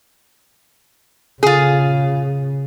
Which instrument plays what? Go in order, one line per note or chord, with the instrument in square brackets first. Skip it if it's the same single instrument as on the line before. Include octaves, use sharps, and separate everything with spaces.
[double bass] C#3 [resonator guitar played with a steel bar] F4 G#4